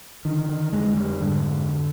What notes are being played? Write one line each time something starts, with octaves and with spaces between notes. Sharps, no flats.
D3 D#3
D#3
F2 G#3
G3
G#2 D3